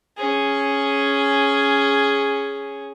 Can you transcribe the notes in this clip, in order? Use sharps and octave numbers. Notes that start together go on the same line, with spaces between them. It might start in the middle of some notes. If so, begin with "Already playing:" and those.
C#4 G#4